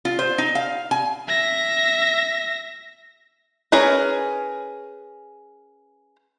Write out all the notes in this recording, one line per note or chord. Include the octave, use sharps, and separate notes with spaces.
F4
C5
D#4
F5
G#5
E5 A#6
C#4 G#4 A#4 B4